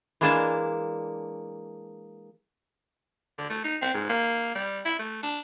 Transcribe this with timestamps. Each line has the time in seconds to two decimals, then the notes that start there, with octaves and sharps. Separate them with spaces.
0.21 E3 G#3 A#3 D4 G#5 A5
3.38 D3
3.50 A3
3.64 D#4
3.82 C4
3.94 G#2
4.09 A#3
4.55 G3
4.85 E4
4.99 A3
5.23 D4